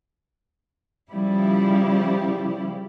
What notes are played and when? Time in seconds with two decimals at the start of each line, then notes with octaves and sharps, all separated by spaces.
1.09 C#3 F3 G3 E4 G4